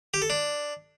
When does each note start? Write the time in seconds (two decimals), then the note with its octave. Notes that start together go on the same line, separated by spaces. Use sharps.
0.14 G4
0.22 A4
0.30 D4